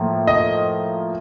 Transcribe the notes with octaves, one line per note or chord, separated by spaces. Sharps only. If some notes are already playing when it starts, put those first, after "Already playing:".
Already playing: A2 F3 A#3
D#5